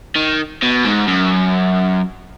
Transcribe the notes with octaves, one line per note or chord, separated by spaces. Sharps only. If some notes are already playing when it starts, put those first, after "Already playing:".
D#3
B2
G#2
F#2